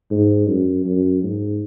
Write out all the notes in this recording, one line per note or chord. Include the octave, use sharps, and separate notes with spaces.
G#2
F#2
F#2
G#2